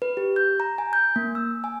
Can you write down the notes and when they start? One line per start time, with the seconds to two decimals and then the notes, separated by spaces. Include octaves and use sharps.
0.02 B4
0.17 G4
0.36 G6
0.60 A#5
0.78 G#5
0.93 G6
1.16 A#3
1.35 E6
1.64 G#5